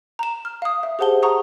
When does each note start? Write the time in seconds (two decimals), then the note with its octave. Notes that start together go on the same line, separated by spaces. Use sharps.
0.19 A#5 E7
0.45 F6
0.62 F5 D#6
0.83 E5
0.99 G4 G#4 C5 F#5 A5 G7
1.23 F#5 A#5 C#6 D#6